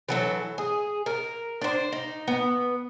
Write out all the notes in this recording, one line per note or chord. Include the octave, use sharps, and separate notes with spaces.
E3 F#3 A4
G#4
A#4
D4 C5
D#4
B3